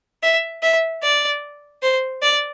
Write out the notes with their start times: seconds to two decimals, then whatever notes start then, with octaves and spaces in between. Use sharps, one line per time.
0.23 E5
0.63 E5
1.03 D5
1.83 C5
2.22 D5